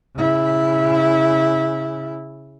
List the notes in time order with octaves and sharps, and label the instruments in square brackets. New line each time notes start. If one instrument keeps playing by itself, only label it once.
[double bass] C#3 E4